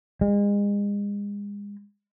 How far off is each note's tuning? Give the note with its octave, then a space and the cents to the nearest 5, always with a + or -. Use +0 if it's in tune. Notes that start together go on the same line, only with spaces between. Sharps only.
G#3 -35